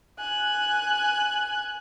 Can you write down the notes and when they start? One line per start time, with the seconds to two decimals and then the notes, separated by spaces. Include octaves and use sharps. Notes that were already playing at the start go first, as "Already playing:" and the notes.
0.19 G#5 F#6